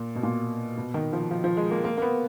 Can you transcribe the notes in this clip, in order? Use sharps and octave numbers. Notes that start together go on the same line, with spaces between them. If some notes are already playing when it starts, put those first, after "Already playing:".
Already playing: A#2
B2
A#2
B2
D#3
F3
F3
F3
G#3
A#3
A#3
A#3
B3